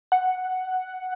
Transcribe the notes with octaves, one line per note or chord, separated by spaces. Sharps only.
F#5